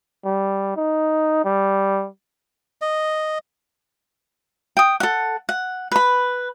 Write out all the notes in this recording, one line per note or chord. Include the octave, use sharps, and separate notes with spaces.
G3
D#4
G3
D#5
G5 D#6
A4 F#5
F#5
B4 B5